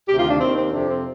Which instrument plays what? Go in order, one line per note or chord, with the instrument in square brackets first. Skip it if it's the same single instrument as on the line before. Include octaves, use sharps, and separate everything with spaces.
[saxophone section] D2 C3 D#3 G4
F4
D4
D#2 D#3 C4
C4
F2 C3 F3 D4
C4